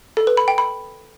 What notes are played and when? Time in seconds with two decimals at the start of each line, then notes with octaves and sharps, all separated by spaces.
0.17 A4
0.27 B4
0.37 B5
0.48 G5
0.58 B5